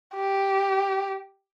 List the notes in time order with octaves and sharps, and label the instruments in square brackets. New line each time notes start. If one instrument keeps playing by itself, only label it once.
[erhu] G4